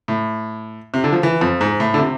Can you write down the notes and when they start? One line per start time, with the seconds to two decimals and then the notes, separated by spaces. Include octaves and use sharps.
0.08 A2
0.94 C3
1.04 D3
1.12 F3
1.23 E3
1.41 F2
1.61 G#2
1.80 A2
1.94 D3
1.99 C3